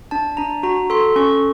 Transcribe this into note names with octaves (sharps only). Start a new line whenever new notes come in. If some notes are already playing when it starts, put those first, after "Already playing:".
D4 A5
D4 A#5
F#4 A#5
A4 C6
C#4 C#6